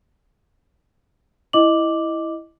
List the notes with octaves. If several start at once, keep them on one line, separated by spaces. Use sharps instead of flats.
E4 D#5 D6 F#7